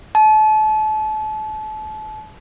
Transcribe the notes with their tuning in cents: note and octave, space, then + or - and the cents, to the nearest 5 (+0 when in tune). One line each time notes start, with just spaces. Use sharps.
A5 -35